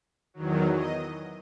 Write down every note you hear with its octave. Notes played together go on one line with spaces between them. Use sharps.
E2 D#3 F#3
D#5